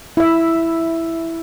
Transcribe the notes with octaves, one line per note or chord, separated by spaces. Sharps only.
E4 E5